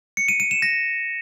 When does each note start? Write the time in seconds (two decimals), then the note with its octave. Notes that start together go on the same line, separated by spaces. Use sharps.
0.17 C#7
0.28 D#7
0.40 D#7
0.51 E7
0.62 A#6